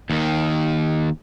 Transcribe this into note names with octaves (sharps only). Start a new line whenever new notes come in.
D#2 D#3